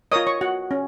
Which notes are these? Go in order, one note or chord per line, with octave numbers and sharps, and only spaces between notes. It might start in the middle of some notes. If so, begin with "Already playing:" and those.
F4 A#4 C#5 D#5 D#6
C#5 C#6
F#4 F#5
C#4